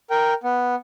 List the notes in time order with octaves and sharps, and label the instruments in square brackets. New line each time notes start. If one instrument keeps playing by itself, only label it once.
[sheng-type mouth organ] A#4 G5
B3